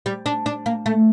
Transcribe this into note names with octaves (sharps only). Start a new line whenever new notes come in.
G3
D4
D4
A#3
A3